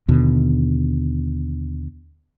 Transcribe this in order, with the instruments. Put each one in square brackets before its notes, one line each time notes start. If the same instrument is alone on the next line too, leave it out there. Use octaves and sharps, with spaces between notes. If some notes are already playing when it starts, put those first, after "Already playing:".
[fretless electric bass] D#2 B2 D3